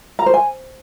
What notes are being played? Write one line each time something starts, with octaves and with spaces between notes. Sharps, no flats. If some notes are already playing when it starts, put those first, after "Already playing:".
A#5
C5
G#5